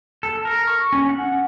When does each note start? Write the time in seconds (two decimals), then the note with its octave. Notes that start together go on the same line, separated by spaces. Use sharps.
0.23 A4
0.45 A#4
0.67 C#6
0.93 C#4
1.09 F#5